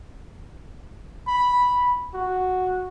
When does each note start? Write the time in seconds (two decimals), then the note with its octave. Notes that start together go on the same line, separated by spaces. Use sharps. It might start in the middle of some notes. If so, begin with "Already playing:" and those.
1.28 B5
2.14 F#4